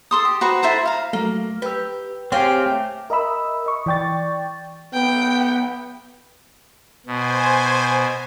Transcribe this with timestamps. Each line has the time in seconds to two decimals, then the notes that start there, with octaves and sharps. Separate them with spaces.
0.11 A4 C6 D#6
0.25 G4
0.41 F#4 B4 C5 A#5
0.62 E4 A4 C5 A#5
0.86 F5 A#5
1.13 F#3 A3 A#3
1.62 G4 B4 E6
2.32 C4 G4 G#4 C#5 F5 G5
2.66 A3
3.10 A#4 D#5 E5 B5 E6
3.66 D#5 C#6
3.86 E3 D5 G5 C#6 A6
4.94 B3 G5
7.07 B2 C5 G#5